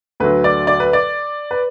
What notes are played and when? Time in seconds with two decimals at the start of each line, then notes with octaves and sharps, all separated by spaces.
0.20 D2 D3 F#3 B4
0.44 D5
0.67 D5
0.80 B4
0.93 D5
1.51 B4